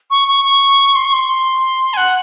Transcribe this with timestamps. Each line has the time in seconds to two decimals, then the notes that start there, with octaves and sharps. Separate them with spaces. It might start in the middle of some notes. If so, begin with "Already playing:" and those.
0.11 C#6
0.28 C#6
0.44 C#6
0.95 C6
1.05 C#6
1.13 C6
1.93 G#5
1.97 F#5